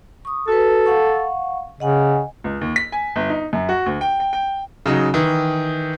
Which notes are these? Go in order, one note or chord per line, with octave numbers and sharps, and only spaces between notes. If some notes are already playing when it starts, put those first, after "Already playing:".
C#6 D#6
F#4 A4 B4
F5 F#5 C#6
C#3 D#5 F#5 G#5
C#2
D#2
B6
G#5
G1
D#4
F#2
F#4
D2
G5
G5
G5
C#3 F#3 D#4
D#3 E3